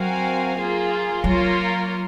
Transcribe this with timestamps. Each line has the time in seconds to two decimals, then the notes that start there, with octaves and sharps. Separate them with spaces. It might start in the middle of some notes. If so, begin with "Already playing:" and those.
Already playing: F#3 C4 F#4 A#4 F5 G#5
0.57 A#3 F4 G#4
1.24 F#3 A#3 F4 A#4 C#5